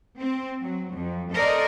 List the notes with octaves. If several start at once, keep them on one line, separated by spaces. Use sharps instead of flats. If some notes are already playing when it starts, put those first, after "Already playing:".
C4
F#3
F2
A4 A#4 C5 D5 D#5